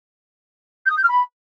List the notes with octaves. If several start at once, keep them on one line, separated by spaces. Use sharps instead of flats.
G6
D#6
G6
F6
B5